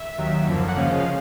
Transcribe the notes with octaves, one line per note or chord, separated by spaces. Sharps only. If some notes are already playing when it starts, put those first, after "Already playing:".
Already playing: E5
D#2 D#3 F#3
F#2 D3 F3 A#3
F#5
C#3 F3 G#3 C#4 F5